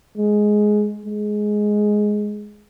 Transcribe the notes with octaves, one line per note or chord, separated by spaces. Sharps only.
G#3
G#3